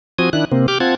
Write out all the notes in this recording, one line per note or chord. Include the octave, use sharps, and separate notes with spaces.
F3 C4 F#4 G#5 D#6
D#3 D4 E4 F#6
C3 A#3 C4
G4 D6 F6 G6
C4 F4 F#5 A5 G#6